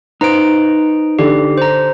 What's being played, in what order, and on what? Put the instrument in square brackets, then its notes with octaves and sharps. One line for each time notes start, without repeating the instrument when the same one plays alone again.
[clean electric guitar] D#4 B4 C5 [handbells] A#5 D7
[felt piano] D3 [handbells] G4
[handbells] C5 A#5